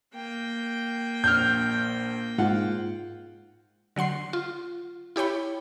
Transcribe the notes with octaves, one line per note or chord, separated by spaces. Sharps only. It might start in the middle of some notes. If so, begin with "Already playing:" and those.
A#3 G5
A#1 F6 G6
G#2 F4 F#5
D3 F#3 F#5 C6 C7
F4
E4 G4 C#5 G5 B5